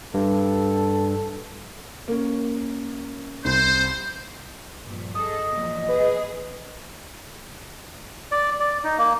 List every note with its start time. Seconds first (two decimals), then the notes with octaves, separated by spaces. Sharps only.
0.14 G2 A4
2.08 A#3 C#4
3.45 C2 C5
4.85 G2 A#2 F3
5.15 G#4 A4 D#5
5.49 E2 A#2 F3
5.89 G#4 B4
8.31 D5
8.60 D5
8.84 D#4
8.98 A#3